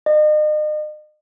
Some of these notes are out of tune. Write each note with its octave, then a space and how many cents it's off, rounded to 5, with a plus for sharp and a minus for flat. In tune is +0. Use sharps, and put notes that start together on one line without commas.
D#5 -40